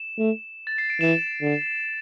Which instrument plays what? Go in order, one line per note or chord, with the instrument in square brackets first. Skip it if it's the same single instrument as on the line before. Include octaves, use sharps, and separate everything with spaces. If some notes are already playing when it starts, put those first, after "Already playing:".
Already playing: [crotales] E7
[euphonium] A3
[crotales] A6
C7
D7
[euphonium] E3 [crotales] E7
[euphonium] D3